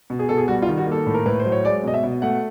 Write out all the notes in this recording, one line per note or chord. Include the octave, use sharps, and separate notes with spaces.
B2
G#4
B2 A4
G#4
G3 F#4
F4
D#3
F#4
A#3
A4
A2
A#4
A2 B4
C5
F#3
C#5
G#3 D5
B2 D#5
E5
B2
A3 F#5